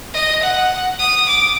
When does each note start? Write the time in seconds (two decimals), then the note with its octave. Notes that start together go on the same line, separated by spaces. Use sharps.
0.14 D#5
0.42 F#5
0.99 D#6
1.27 D6